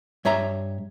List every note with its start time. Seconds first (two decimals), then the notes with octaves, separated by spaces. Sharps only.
0.25 G2 C#5 E5 A#5